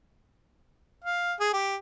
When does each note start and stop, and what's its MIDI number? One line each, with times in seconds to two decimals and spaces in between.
1.04 1.34 77
1.40 1.51 68
1.53 1.76 67